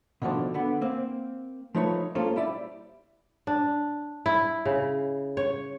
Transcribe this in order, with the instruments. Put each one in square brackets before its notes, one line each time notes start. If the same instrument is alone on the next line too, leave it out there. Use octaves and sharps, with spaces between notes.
[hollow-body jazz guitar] B2 D3 D#3 F3 D4
D3 B3
A#3 C4
F3 A3 D#4 B4 C#5
G#3 A#3 C#4 F4 A4 C5
G3 E4 D5
[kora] D4
E4
C#3
C#5